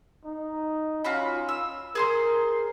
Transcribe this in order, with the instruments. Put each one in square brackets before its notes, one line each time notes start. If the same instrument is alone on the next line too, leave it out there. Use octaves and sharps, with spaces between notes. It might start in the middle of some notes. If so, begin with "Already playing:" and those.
[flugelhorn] D#4
[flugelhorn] C#4 [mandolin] F4 F#4 B5
[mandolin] E6
[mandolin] G#4 C5 C6 [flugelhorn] A#4